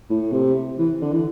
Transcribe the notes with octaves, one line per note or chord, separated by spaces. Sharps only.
A2
C3
E3
D3
E3